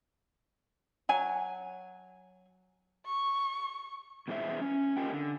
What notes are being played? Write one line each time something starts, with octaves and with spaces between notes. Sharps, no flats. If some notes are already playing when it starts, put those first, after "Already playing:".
F#3 G#5
C#6
B2 E3 G#3 A3 C5 E5
C#4
F4 G4 A#4 D#5 G5 G#5
D3